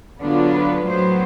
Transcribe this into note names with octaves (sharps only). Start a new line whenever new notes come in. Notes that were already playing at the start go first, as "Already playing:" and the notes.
D3 F#3 B3 D4 F4
B4
A2 F#3 B3 C5